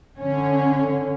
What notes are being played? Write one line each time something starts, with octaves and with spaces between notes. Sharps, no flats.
D3 C#4